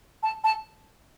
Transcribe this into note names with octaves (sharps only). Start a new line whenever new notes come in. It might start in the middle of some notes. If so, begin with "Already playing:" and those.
A5
A5